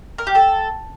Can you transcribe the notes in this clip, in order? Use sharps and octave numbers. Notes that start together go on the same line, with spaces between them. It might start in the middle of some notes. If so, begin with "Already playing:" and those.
A#4
G4
A4